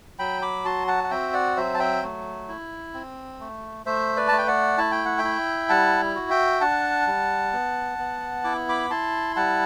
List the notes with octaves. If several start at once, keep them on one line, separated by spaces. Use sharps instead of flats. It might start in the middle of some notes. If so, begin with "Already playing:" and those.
F#3 G5 B5
B5 D6
F#4 A5 C6
F#5 A5
F#5
C4 E5 G5
D5 F#5
F#3 C5 E5
A5
E5 G5
A3
E4
C4
A3
A3 C5 E5
B4 D5
A3 A5
G5
D5 F#5
E4 A5
G5
F#5
E5 G5
E4
G3 F#5 A5
F#4
E5 G5
D4 F#5 A5
G3
B3
B3
E4 D6
B5 D6
E4 A5 C6
G3 F#5 A5